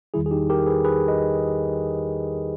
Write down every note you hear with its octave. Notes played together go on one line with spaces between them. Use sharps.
E2 D#3 G3 E4 G#4
G#4
D#4 G4
G4 A#4
G#4 B4
G#4 B4
B4 D#5